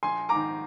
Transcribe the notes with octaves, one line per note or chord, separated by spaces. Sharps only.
A#1 G#5 C6
G#2 A#5 D6
D#3